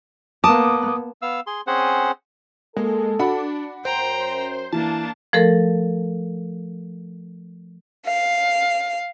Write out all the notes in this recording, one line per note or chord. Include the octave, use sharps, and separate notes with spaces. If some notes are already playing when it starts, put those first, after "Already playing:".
A#3 B3 A5 D6 D#6
B3 F5 E6
G#4 C6
C4 C#4 G#4 C5 F#5
G#3 A#3 A4
D4 F#4 F#5 B5
F#2 C5 G5 A#5
E3 A#3 D4 A5
F3 A3 A4 A#4
F5